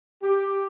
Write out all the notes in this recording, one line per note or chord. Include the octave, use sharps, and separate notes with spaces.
G4